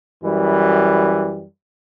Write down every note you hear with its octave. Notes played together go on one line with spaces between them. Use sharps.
F#2 E3 G3